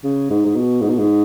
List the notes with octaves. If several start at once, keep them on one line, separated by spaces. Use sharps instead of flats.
C#3
G#2
G#2
B2
G#2
B2
G#2